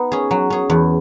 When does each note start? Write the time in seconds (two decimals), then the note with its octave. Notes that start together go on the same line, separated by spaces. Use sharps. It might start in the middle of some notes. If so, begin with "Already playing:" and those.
Already playing: B3 D#4
0.12 C#4 G#4
0.31 F#3
0.50 C#4 G#4
0.70 E2